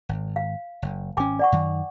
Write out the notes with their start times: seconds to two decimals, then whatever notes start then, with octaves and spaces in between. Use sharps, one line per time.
0.09 G#1
0.36 F5
0.82 F#1
1.17 G#1 C#4 G5 G#5 D6
1.39 D5 F#5 C#6
1.52 F#2 D#3